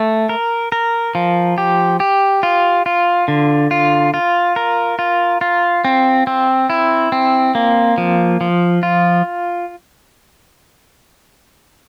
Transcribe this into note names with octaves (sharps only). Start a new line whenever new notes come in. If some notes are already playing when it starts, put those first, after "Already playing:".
Already playing: A3
A#4
A#4
F3
G4
G4
F4
F4
D3
F4
F4
A#4
F4
F4
C4
C4
E4
C4
A#3
F3
F3
F4